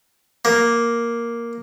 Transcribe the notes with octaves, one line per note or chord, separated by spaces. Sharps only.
A#3